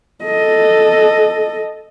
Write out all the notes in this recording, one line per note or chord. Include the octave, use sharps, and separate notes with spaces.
A4 D#5